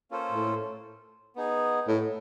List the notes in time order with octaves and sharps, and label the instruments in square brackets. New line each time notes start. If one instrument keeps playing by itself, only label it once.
[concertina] A#3 C#4 F4 A4 C5
[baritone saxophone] A2
[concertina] B3 D#4 G#4
[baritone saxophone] A2